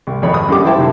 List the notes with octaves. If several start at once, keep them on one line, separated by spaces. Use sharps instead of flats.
C2
G#1 F2 C#5 B5
B5 D#6
F#2 D3 G3 G4 D6
E4 C5 E5 G5 A5
F#2 C3 D#3